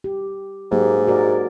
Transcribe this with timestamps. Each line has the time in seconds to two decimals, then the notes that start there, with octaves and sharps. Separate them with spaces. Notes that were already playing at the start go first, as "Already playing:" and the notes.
0.04 G4
0.71 G#2 F#3 A#3 G4
1.07 F#4 A#4 D5